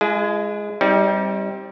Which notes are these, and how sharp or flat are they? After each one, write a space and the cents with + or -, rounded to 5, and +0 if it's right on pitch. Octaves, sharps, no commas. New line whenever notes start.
G#3 +0 F4 -45 G#5 +40
G3 +0 C4 +10 D#4 +40